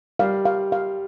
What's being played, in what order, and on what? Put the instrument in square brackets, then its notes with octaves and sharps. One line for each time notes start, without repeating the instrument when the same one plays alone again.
[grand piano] G3 [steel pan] F5
[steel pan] F5
F5